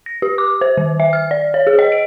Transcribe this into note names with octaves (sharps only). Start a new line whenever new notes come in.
A#6
G4
D6
C5
D#3
E5
F6
D5
C#5
G#4
D#5
D7